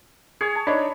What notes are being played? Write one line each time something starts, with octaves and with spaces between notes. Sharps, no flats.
G#4 C#5
A5
D4 D#4 C#5 B5